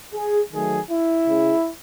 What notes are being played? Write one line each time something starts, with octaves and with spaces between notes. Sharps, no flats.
G#4
D#3 F#3 A3 G#4
E4
C#3 G#3